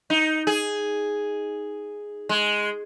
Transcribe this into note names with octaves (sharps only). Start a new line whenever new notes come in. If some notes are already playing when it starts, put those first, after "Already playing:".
D#4
G#4
G#3